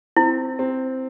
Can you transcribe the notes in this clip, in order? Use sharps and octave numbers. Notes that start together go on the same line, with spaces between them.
C4 E4
C4